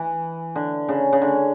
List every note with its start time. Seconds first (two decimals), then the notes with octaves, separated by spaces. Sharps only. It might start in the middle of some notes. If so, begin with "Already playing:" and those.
Already playing: E3
0.56 D3
0.88 C#3
1.13 C#3
1.22 D3